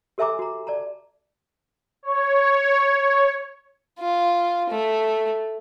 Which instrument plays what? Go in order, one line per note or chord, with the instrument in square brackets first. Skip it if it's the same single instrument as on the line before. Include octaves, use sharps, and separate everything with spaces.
[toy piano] G4 A4 E5 G#5 A#5 D6
F#4 A#5
D5 A5 A#5
[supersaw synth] C#5
[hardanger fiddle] F4
A3